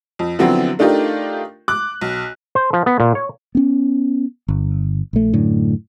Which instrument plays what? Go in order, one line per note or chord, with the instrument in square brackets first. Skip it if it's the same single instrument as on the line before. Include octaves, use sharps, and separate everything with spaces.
[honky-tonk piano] F2
D3 F3 F#3 B3 C4 E4
A3 D4 D#4 F4 G4 A#4
D6 F#6
B1
[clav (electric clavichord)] C5
F3
B3
A#2
C#5
[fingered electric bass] B3 C#4
G1
A#1 A3
F#2 A2 D3